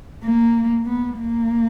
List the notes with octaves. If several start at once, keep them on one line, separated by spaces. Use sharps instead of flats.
A#3
B3
A#3